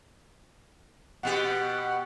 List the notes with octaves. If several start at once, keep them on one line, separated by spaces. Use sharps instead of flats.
B2 B3 G4 F#5